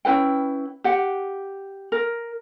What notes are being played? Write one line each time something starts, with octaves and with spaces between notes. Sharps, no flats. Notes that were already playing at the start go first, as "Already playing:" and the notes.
C#4 E4 B4 G5
G4 F#5
A#4